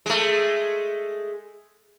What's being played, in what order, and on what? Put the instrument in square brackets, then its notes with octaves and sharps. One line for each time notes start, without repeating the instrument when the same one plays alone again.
[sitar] G#3 A3